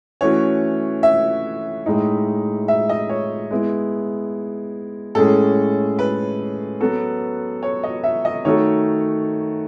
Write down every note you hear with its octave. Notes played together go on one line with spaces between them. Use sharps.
E3 A3 C#4 F#4 C#5
E5
A2 G#3 D#4
E5
D#5
C#5
G#3 B3 E4
A2 G#3 C#4 G#4 A4
B4
F#3 B3 F#4 A4
C#5
D#5
E5
D#5
D#3 A3 D#4 F#4 A4 C#5